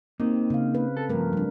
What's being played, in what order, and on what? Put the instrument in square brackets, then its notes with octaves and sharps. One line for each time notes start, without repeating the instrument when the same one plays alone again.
[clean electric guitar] A#3 D#4 [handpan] C4
[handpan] C#3 F5
B4
[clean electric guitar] A4
[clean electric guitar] G2 F3 [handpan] A3 A#4
[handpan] G3 D4